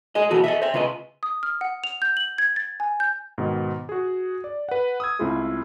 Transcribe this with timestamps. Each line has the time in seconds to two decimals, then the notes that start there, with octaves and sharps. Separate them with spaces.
0.15 G#4 D#5
0.31 B2 E3 F#4 A4
0.44 A4 D#5 E5
0.62 C5 E5
0.74 C#3 F4 B4 D#5
1.23 D#6
1.43 F6
1.61 F#5
1.84 F7
2.02 G6
2.17 F#7
2.38 G#6
2.56 A6
2.80 G#5
3.00 G6
3.38 G#2 B2 D#3
3.89 F#4 G#4
4.44 D5
4.69 B4 F#5
5.00 D#6 E6 G#6
5.19 C#2 A3 C4 E4 F4 G#4